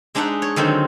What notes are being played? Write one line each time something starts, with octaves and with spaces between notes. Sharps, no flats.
G#3 D4 D#4 E5 F#5
C#5
D3 D#3 F#3 C4